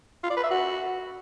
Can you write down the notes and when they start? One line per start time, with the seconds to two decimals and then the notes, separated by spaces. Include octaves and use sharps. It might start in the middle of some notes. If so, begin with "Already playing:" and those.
0.23 F4
0.30 D5
0.37 B4
0.44 E5
0.50 F#4